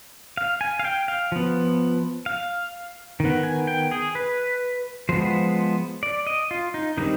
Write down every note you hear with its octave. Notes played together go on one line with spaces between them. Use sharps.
F5
G#5
F5
G5
F5
F3 B3
F5
D#3
B3
G#5
G5
G#4
B4
F3 G#3 B3 C5
D5
D#5
F4
D#4
D#3 G3 C4 D#4